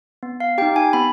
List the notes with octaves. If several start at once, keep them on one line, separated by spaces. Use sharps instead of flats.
B3
F5
D#4 G4 G5
G#5
B3 B5